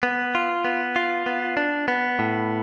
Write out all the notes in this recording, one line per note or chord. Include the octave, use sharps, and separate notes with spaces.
B3
F4
B3
F4
B3
D4
B3
A2